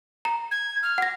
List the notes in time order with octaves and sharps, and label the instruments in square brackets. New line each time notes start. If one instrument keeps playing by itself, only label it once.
[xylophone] A#5
[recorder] G#6
F6
[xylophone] F#5 A#6